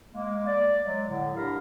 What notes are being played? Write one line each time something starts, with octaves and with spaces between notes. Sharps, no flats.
G#3 A#3
D5
F#3 G#3
A2 D3
D4 G4 A#4 F5 A#5 B5